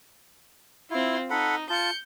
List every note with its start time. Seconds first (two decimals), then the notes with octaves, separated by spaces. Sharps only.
0.90 C4 E4 F4
1.30 D#4 A4 F#5 B5
1.70 F4 A5 G6 C#7